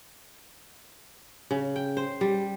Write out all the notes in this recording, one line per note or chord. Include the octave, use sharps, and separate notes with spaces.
C#3
G5
C5
G3